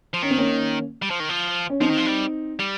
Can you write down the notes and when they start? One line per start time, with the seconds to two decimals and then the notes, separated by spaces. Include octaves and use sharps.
0.14 F3
0.22 D#3 C#4
0.31 C4
0.37 A#3 C#4
1.02 G3
1.10 F3
1.20 D#3
1.29 F3
1.70 C#4
1.80 F3 C4 D#4
1.89 D#3
1.97 F3
2.06 G3
2.59 G3